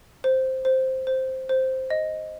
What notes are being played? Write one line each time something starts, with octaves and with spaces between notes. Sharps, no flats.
C5
C5
C5
C5
D#5